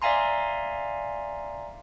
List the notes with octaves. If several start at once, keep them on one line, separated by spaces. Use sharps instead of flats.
D5 E5 F5 G#5 A#5 C6